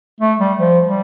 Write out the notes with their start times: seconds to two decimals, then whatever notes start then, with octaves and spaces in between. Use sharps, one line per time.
0.20 A3
0.39 G3
0.59 F3
0.88 G3